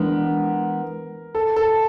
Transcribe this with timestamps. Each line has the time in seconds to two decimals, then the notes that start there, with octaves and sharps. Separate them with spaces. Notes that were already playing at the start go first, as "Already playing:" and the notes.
Already playing: E3 G#3 B3 D4 A#4
1.35 A4
1.56 A4